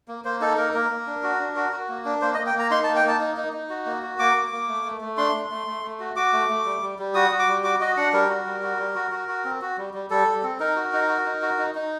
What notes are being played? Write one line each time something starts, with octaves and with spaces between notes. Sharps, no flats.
A#3
A#3 C5
D#4 A4
A#3 A#4
A#3 A#4
A#3
D4
F#4
D4
F#4
F#4
A#3
D4
A#3 C5
D#5
A#3
G5
A#3 A#5
D#4 C6
A5
A#3
G5
A#3 A5
D#4
D#4
D#4
F#4
A#3
F#4
A#3 D6
A#3
A#3
A3
A3
A3
D4 C6
A3
A3
A3
A3
F#4
F#4 D6
A3
A3
G3
G3
G3
F#4 D#6
F#4
D6
G3
F#4 D6
F#4 D#5
D4 F#5
G3 A#4
F#4
G3
F#4
G3
F#4
F#4
F#4
C4
F#4
G3
G3
G3 A4
G3
C4
D#4 A#4
F#4
D#4
F#4
D#4
F#4
D#4
D#4